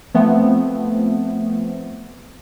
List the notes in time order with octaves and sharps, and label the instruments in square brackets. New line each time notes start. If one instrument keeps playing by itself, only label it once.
[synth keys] F3 A3 B3 C4